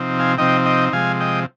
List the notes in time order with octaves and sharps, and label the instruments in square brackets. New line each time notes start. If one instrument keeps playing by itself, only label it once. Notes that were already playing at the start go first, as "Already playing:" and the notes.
Already playing: [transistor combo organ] C3 F3 C4 D#4
F5 G#5
C3 F3 C4 D#4 D#5 G5
D#5 G5
C3 F3 G#3 F5 G#5
D#5 G5